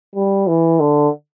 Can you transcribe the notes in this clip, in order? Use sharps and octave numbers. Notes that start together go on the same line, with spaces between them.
G3
E3
D3